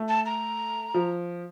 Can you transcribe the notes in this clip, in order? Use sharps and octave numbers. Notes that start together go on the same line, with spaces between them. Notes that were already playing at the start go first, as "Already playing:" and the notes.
Already playing: A3
A5
A#5
F3